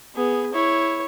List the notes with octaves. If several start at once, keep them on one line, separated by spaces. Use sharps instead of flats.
B3 G#4
E4 C#5